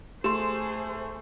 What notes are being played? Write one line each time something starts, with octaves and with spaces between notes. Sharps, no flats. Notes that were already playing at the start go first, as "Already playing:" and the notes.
A3 G4 G#4 C5 C6 E7